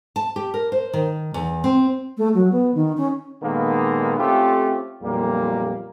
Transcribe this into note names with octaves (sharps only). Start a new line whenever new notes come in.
A5
G4
A#4
C5
D#3
E2
C4
A3
F#3
B3
D#3
C#4
A#2 D#3 G#3 A#3 B3 A4
A3 C4 C#4 F4 G4 A4
B1 F2 A#2 G3 A#3